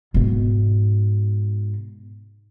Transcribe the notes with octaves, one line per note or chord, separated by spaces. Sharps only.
G#2 B2